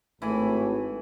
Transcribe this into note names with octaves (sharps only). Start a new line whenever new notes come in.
G#1 A2 E3 A3 G#5 B5